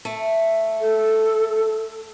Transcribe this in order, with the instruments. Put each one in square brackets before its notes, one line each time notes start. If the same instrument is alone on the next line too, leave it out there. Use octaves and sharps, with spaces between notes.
[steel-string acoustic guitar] A3
[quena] A4